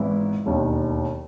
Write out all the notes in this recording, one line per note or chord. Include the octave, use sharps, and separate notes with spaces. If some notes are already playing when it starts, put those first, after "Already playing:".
Already playing: G#1 G#2 E3 B3 E4
E1 D#2 D#3